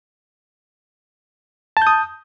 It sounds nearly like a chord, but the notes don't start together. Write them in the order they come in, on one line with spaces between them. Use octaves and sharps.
A5 G6 D#6